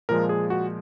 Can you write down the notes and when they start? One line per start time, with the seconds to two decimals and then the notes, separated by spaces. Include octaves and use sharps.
0.09 A#2 F3 G#3 A#4
0.29 G#4
0.50 F#4